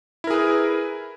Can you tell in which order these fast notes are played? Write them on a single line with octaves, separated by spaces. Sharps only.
E4 A#4 G#4 B4